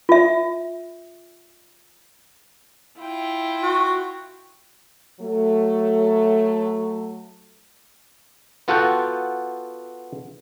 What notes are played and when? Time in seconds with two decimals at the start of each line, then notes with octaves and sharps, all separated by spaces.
0.09 F4 E5
2.98 E4 F4 G5
3.63 F#4
5.21 F#3 A3
8.68 B3 F4 F#4 A4 F#5 G5